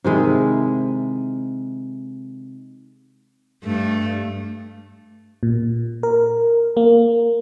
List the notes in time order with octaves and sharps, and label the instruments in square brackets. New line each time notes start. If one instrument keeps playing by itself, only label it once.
[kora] C3 D#3 G#3 E4
[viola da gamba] G2 A3
[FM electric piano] A#2
A#4
A#3